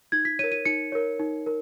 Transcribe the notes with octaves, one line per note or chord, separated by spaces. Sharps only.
D#4 G#6
B6
A#4 C#5 D#7
D#7
D#4 C#7
A#4 C#5
D#4
A#4